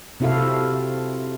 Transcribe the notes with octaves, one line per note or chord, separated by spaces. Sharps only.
C3 C4 E4 F#4 A4 F5